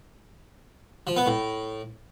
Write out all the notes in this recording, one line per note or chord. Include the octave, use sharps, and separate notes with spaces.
F3
B3
A2